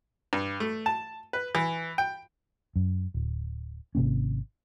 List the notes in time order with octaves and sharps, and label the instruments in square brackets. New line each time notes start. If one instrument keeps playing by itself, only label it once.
[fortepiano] G2
A3
A5
B4
E3
G5
[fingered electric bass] F#2
D1
G#1 C3 A#3 C#4